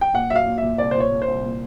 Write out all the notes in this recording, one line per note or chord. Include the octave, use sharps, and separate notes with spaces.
G5
A#2 F#5
F#3 E5
F5
A#2
A#2 E5
C2 D5
A#2 C5
C#5
A#2
C5
C2
A#2